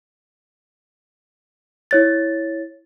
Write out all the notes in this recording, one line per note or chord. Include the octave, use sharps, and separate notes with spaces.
E4 C#5 A6